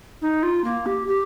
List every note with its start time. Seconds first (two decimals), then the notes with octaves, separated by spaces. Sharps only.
0.22 D#4
0.43 F4
0.64 A#3
0.86 G4
1.08 G4